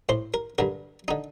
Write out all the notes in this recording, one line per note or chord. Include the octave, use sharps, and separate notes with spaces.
A2 C5
A#4
G2 D3 A#4
D3 D#4